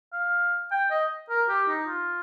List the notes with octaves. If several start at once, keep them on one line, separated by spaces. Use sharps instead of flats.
F5
G5
D#5
A#4
G4
D#4
F4